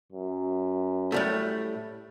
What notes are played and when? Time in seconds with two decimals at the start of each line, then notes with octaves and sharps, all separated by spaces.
0.12 F#2
1.12 A2 G3 A3